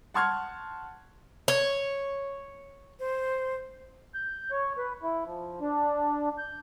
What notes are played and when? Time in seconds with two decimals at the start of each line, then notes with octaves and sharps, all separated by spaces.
0.14 F#5 A5 C6 C#6 F6 G#6
1.48 C#5
3.00 C5
4.14 G6
4.51 C#5
4.78 B4
5.03 E4
5.26 F3
5.61 D4
6.38 G6